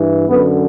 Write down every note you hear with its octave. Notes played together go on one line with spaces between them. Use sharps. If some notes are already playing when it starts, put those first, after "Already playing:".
Already playing: G2 E3
F#2 D3 B3